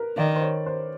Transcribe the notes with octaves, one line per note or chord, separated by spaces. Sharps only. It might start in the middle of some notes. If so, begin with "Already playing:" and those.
Already playing: A#4 B4
D#3 D5
C5
C#5
C5